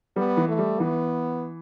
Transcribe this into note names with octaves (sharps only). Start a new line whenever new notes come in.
G3 B3
E3
A3
G3
E3 B3